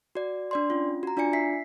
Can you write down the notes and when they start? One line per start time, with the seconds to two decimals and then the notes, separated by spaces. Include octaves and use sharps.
0.15 F#4 D5
0.51 D4 D5 C6
0.70 C#4 F4
1.03 F#4 A#5
1.17 D4 F4 D5 G#5 C#7
1.33 E5 B6 C7